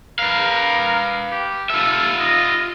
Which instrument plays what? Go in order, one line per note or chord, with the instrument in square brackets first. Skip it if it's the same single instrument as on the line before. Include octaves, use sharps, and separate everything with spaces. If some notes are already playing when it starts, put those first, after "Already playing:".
[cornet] A#4 [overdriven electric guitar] B4 F5
[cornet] G4
[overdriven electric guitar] F4 E5 [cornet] A4
[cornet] D#5